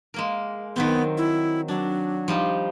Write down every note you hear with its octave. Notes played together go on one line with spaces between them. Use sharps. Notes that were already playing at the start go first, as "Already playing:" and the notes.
G#3 A#3 A#4
D#3 F#3 B3 C4
E4
F#3 D4
F3 G3 D#4